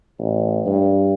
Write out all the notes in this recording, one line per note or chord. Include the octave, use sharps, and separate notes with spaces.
A1
G2